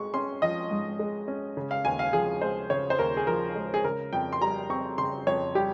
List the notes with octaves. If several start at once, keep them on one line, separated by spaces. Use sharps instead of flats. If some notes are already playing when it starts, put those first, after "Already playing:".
Already playing: G#2 G#3 C#6
C#4 C6
F3 D#5
G#2
G#3
C#4
C#3
F5
D#2 G#5
F5
F3 G#4
G#3 C5
C#3 C#5
C5
D#2 A#4
G#4
F3 A#4
G#3
G#4
C#3 A#4
F2 G5
C6
G3 A#5
C4 C#6
C#3 C6
F2 C#5
G3 G4